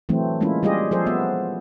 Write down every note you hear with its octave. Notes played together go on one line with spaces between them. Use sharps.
E3 F#3 A3 C4
G#3 A#3 C#4 E4 F4
G3 F4 G4 G#4 D#5
F3 F#3 G#4 A4 C5
B3 E5